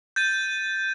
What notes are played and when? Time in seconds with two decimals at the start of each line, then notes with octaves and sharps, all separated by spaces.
0.16 G6 A6 D#7